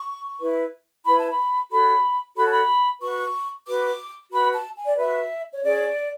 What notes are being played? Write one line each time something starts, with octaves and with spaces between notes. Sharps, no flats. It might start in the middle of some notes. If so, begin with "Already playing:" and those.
Already playing: C#6
E4 B4
E4 B4 B5
A5
B5
F#4 A4 C#5 B5
F#4 A4 C#5 B5
A5
B5
F#4 B4 C#6
F#4 B4 D6
F#4 B4 B5
A5
G#5
D5
F#4 B4 E5
C#5
C#4 G#4 C#5 D5